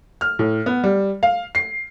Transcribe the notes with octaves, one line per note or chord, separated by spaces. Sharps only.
F6
A2
B3
G3
F5
C7